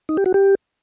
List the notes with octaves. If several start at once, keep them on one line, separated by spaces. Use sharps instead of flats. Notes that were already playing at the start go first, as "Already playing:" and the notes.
D#4
G4
F#4
G4